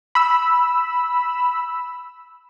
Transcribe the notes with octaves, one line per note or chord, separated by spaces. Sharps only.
B5 E6